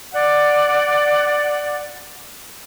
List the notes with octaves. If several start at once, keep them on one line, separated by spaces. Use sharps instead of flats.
D5 F#5